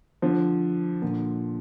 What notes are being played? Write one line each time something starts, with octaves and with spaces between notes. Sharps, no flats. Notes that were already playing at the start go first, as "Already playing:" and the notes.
D3 F3
A#2 D3